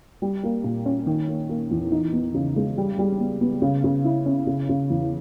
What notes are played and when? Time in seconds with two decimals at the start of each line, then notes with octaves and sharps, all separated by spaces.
0.22 G3
0.43 A#3
0.64 A#2
0.86 C#4
1.07 D#3
1.28 A#3
1.49 A#3
1.71 E2
1.92 D#4
2.13 B3
2.34 C#3
2.56 G#3
2.78 G3
2.99 G3
3.20 B3
3.41 B3
3.62 C#3
3.84 C#3
4.04 E4
4.26 C#4
4.47 C#3
4.69 C#3
4.90 E2